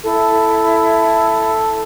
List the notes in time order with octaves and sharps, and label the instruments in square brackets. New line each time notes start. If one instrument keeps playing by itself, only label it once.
[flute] E4 [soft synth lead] A4